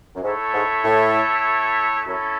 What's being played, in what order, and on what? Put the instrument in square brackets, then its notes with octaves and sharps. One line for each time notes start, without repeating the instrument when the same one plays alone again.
[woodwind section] F#2
[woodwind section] G#2 [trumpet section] A3 E4 A4 C#5 E5
[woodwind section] G#2
A2
[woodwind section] F#2 [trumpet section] C#4 E4 A4 C#5 E5